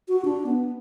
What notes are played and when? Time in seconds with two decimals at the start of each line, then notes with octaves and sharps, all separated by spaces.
0.09 F#4
0.25 D4
0.46 B3